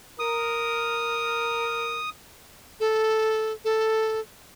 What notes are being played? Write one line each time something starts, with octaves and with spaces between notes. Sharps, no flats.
A#4 D#6
A4
A4